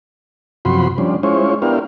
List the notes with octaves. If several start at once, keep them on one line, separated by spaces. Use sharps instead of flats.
F#2 C3 F3 F#4 B5 C6
F3 G3 C#4 D4
G#3 C#4 E4 F4 C5 C#5
B3 D4 E4 G4 A#4 F5